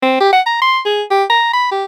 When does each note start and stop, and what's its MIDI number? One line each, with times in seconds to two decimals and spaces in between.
0.02 0.16 60
0.21 0.33 67
0.33 0.41 78
0.46 0.61 82
0.61 0.79 84
0.85 1.03 68
1.11 1.24 67
1.30 1.48 82
1.53 1.69 83
1.72 1.84 67